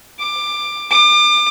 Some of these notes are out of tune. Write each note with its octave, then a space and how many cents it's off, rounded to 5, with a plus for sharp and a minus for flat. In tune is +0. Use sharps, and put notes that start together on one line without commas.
D6 +20
D6 +35